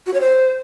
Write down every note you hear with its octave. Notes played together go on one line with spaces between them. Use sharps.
F#4
C#5
C5